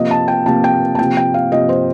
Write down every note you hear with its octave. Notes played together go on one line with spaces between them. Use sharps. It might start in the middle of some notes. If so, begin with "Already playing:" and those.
Already playing: C3 F3 A#3 D#5
A5
G5
C3 F3 A#3 A5
G5
A5
C3 F3 A#3 G5
G5
F5
C3 F3 A#3 D#5
C5